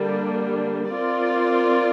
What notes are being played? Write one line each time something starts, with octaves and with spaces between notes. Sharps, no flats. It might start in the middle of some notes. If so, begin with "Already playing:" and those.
Already playing: D3 G3 A#3 D4
C4 F4 A#4 D5